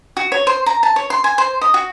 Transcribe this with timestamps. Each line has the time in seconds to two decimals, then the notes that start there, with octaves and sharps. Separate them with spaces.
0.17 F#4
0.32 C#5
0.47 C5
0.66 A#5
0.83 A5
0.96 C#5
1.10 C6
1.24 G#5
1.38 C5
1.61 D#5
1.74 F#4